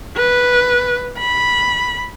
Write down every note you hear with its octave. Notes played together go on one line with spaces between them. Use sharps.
B4
B5